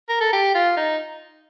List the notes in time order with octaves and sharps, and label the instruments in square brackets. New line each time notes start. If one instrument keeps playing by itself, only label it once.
[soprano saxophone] A#4
A4
G4
F4
D#4